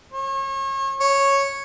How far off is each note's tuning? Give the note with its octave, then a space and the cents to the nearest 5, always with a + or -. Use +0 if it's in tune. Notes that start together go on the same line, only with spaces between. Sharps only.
C#5 -35
C#5 -5